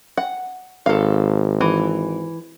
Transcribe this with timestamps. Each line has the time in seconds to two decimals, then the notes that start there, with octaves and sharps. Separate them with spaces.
0.17 F#5
0.86 G#1 A4 F5
1.61 E3